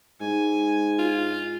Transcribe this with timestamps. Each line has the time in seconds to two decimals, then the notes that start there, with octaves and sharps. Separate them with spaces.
0.21 G#2 G#5
0.99 F4